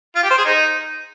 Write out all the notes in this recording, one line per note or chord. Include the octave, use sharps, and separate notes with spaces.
F4
G4
C5
G#4
D#4